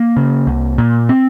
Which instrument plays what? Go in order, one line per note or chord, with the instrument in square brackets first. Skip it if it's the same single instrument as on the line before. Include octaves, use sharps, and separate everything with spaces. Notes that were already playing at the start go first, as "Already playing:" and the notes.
Already playing: [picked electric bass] A#3
C#3
C2
A#2
C4